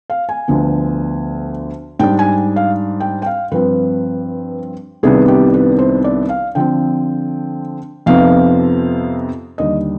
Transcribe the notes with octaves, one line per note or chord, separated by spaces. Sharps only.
F5
G#5
D2 D3 F3 B3
G#2 G3 D4 G5
G#5
F5
G5
G5
F5
G2 F3 C4 B4
C2 C3 D#3 B3 D4 G#4
G4
B4
C5
D5
F5
D3 F3 C4 G5
F2 C3 F3 B3 D#4 F5
D#2 D3 G3 D#5